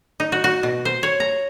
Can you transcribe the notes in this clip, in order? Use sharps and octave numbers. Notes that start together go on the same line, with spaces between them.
D#4
F#4
F#4
B2
C5
C#5
A#5